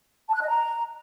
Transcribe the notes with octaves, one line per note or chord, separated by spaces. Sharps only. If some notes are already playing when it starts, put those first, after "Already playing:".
A5
F#6
D#5
A#5